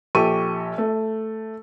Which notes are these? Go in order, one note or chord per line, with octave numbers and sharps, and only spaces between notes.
A#1 G4 A4 C#6 D#7
A3